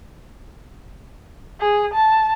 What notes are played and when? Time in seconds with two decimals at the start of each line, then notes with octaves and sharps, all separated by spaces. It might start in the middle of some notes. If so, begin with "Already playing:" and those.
1.60 G#4
1.94 A5